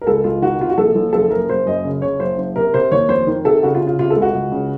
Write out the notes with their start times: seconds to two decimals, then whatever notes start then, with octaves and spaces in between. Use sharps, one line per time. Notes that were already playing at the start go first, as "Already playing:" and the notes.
0.01 A#4
0.07 C#2 A4
0.24 C#2 F4
0.42 D#3 F#4
0.60 C3 F4
0.69 F#4
0.78 A#1 A4
0.95 A#1
1.13 F#1 A4
1.31 F#1 A#4
1.49 F#1 C5
1.66 F#2 D#5
1.85 C#3
2.02 C#3 C#5
2.20 F#1 C5
2.38 F#1
2.56 C3 A#4
2.74 C3 C5
2.92 D#2 C#5
3.09 F1 C5
3.27 D#3
3.45 C3 A4
3.63 C#3 F#4
3.75 F4
3.81 C#3
3.87 F4
3.99 C3 F4
4.10 A4
4.16 C#2
4.22 F#4
4.35 C#2
4.52 C#3